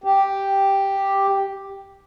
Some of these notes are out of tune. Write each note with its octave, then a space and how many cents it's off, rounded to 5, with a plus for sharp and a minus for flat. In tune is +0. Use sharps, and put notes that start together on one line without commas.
G4 +0